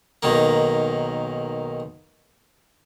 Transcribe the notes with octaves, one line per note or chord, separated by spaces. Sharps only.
B1 D#3 A#3